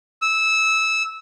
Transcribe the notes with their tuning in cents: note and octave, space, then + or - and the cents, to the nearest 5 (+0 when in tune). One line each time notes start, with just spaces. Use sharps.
E6 -15